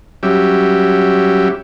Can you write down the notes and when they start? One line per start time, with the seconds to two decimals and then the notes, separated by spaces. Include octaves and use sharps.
0.23 F#3 G3 C#4 G4 E5